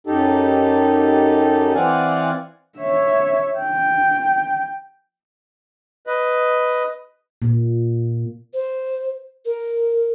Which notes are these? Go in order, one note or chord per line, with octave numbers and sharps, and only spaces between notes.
F#2 D#4 G4 A4
E3 C4 D5 F5 F#5 G#5
C#5 E5
G5
B4 D#5
A#2
C5
A#4